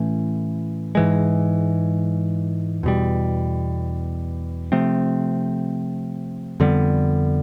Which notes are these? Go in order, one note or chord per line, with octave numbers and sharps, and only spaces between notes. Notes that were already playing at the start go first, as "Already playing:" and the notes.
Already playing: A2 E3 A3 C#4
G#2 E3 G#3
E2 B2 G3
C3 F3 A3 C4
F2 D3 G3 B3